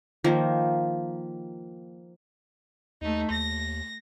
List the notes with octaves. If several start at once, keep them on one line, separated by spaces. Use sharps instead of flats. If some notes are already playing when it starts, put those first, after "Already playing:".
D#3 F3 A#3
D#2 A3 D#4
D#2 A#6